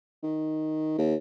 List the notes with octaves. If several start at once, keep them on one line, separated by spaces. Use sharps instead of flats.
D#3
D#2